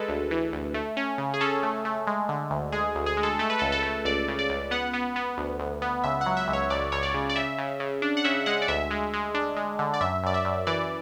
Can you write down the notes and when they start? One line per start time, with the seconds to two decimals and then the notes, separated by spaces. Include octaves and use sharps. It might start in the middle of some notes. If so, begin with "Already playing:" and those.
Already playing: G#3 A4 B4
0.08 D2
0.31 E3
0.53 D2
0.74 A3
0.97 C#4
1.18 C#3
1.34 G#4
1.41 C#4 A4
1.63 A3
1.85 A3
2.07 G#3
2.29 D3
2.51 D2
2.72 G#3 G#4
2.95 D2
3.06 G#4
3.17 G#3
3.23 A4
3.39 A3 A4
3.50 B4
3.59 C#2 A4
3.72 A4
3.83 A3
4.05 C#2 D5
4.28 C#3
4.39 D5
4.50 C#2
4.71 B3 F#5
4.94 B3
5.16 B3
5.38 D2
5.60 D2
5.82 B3
6.04 C#2 E5
6.21 F#5
6.26 F#3
6.37 E5
6.48 C#2
6.53 C#5
6.70 C#2 D5
6.92 C#2 C#5
7.03 D5
7.14 C#3
7.30 D5
7.36 C#3 E5
7.58 C#3
7.80 C#3
8.02 D4
8.17 F#5
8.24 C#3 E5
8.46 G#3 F#5
8.62 D5
8.68 D2 E5
8.91 G#3
9.13 G#3
9.34 D4
9.57 G#3
9.79 D3
9.94 D5
10.01 F#2 E5
10.23 F#2 D5
10.34 E5
10.45 F#2
10.67 E3 D5